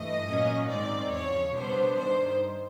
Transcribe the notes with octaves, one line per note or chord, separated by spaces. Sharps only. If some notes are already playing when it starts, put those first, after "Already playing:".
Already playing: G2 E3 A3 D#5
A#2 F#3 A#3 C#4
G#2 D#3 G#3 C4 D5
E2 C#3 F3 C#5
B2 G3 B3 D4 C5
G2 D#3 G3 C5